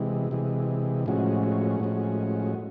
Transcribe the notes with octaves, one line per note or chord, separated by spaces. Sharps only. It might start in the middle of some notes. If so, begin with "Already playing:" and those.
Already playing: C3 E3 G#3
C3 E3 G#3
A2 F3 G#3 C#4 F#4
A2 F3 G#3 C#4 F#4